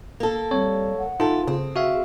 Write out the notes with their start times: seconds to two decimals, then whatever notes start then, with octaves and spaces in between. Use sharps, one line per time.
0.20 A#3 A4
0.51 G3 C4 C#5
0.98 F#5
1.20 E3 D#4 F4 A4
1.47 C#3 C4 G#4
1.76 F#4 E5 F5